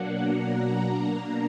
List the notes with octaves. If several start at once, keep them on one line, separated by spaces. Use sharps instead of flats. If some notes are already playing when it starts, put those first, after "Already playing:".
Already playing: B2 F#3 A#3 D4 F#5
A#5
B2 A#3 D4